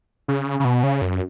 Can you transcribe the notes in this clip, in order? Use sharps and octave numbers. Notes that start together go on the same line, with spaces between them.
C#3
C#3
B2
C#3
F#2